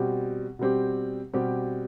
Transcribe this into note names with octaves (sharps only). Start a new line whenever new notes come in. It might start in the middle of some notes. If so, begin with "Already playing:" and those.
Already playing: B2 G3 C4 G4
B2 G3 C4 G4
B2 G3 C4 G4